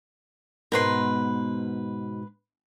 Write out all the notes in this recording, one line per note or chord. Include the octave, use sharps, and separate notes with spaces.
G#2 B2 A#4 B4 C6